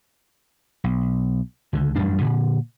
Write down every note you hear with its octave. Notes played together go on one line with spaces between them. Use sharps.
B1
C#2 D3
A1 F#2 G3 D4
A#2 D3